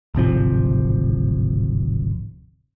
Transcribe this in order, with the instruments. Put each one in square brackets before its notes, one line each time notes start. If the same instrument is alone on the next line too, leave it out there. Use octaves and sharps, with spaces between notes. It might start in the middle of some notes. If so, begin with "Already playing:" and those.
[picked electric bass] D1 G#1 C3 F3